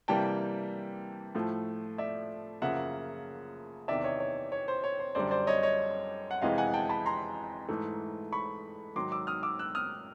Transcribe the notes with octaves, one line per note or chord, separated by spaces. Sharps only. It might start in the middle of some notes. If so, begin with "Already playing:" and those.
C3 E3 G3 A#3 G5 A5
A2 F3 A3
D5 E5
F#2 C#3 F3 A#3 E5 F#5
E2 C3 D#3 D5 E5
C#5 D#5
C#5
C#5
C5
C#5
C5
F#2 D3 G3 C5 D5
C5 D5
C#5 D#5
C#5 D#5
F#5
F2 C3 E3 G#3 D#5 F5
F#5 G#5
G5 A5
A5 B5
A#5 C6
G#2 E3 A3
B5 C#6
G#2 D#3 F#3 C6 D6
D6 E6
D#6 F6
D6 E6
E6 F#6
D#6 F6